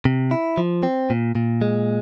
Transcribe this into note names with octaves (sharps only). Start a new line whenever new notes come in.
C3
E4
F3
C4
A#2
A#2
G#3